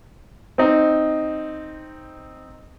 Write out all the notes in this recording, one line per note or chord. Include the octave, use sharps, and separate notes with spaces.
C4 D#4